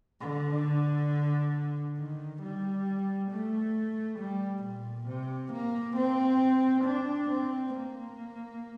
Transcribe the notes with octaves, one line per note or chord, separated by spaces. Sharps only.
D3
D#3
G3
A3
G3
A#2
C3
A#3
C4
D4
C4
A#3